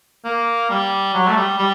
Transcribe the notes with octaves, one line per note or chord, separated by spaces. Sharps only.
A#3
G3
F#3
A3
G3
G3